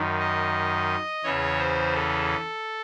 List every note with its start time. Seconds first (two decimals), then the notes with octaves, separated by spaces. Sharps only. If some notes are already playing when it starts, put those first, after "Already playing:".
Already playing: F#2 D#3
0.20 D#5
1.24 E2 C#3 E3 C#5
1.58 C5
1.94 A4